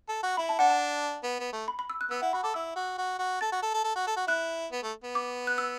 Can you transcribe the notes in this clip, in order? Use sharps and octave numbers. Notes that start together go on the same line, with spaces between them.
A4
F#4
E4 B5
A5
D4 F#5
A5
B3
B3
A3
B5
B5
E6
F#6
B3 E6
E4 F#5
F#4 B5
A4 D6
E4 E6
F#4
F#4
F#4
A4 A6
F#4
A4
A4
A4
F#4
A4
F#4
E4 F#6
B3
A3
B3
D6
F#6
E6